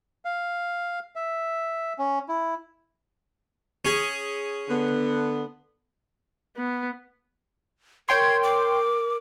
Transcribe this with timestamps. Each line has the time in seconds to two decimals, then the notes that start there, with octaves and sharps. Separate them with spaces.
0.25 F5
1.16 E5
1.99 C#4
2.29 E4
3.85 C#4 G#4
4.69 D3 B3
6.57 B3
8.09 A#4 C#5 G5 C6 G#6
8.43 D6